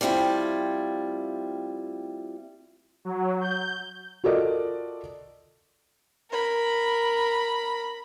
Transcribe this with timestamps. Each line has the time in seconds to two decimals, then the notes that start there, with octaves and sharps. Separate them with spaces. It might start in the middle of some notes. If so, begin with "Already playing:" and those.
0.01 G3 A3 C4 E4 F4
3.05 F#3
3.41 G6
4.24 F4 F#4 A4 A#4 D5 D#5
6.30 A#4 B5